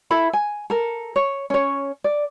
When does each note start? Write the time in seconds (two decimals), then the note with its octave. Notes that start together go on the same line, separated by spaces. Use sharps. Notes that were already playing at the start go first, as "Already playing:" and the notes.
0.11 E4 A4 B5
0.33 G#5
0.70 A4 A#4
1.16 C#5
1.50 C#4 C#5
2.04 D5